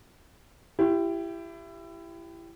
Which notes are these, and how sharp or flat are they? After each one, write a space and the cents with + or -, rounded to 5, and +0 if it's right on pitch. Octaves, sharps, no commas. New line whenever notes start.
E4 +25 G4 +0